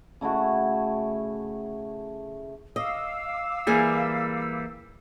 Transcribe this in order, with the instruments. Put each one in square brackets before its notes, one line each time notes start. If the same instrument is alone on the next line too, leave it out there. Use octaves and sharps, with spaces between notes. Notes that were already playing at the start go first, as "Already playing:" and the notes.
[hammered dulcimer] C#3 A3 E4 F#4
[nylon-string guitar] D#5 [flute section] F5 D6 E6
[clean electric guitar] E3 G3 [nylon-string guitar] A#3 G#4 G#5